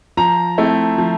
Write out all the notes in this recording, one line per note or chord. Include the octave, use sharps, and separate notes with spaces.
F3 A#5
A3 C4 E4
F3